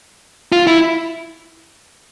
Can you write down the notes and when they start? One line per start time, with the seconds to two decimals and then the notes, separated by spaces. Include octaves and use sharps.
0.52 F4
0.67 E4